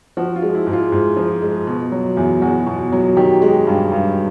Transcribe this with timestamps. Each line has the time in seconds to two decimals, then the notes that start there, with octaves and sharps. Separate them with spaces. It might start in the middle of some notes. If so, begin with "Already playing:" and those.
0.17 F3 F#4
0.36 F4
0.42 G#3
0.55 E4
0.67 G#2
0.73 F4
0.92 G#2
1.17 F3
1.42 G#3
1.67 B2
1.92 F#3
2.17 E2
2.42 E2 F#4
2.67 B2
2.92 F#3
3.17 D#3 G4
3.42 G#3
3.67 G2
3.92 G2